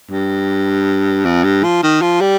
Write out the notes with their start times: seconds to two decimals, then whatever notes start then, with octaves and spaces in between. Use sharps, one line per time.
0.11 G2
1.25 F2
1.44 G2
1.64 F3
1.83 D#3
2.02 F3
2.21 G3